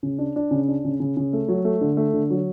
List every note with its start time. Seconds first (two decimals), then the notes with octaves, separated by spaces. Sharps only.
0.03 C#3
0.18 D4
0.36 D4
0.51 C#3
0.68 D4
0.84 C#3
1.00 C#3
1.17 C#3
1.33 A3
1.48 F#3
1.65 A3
1.81 D3
1.97 A3
2.13 D3
2.30 F#3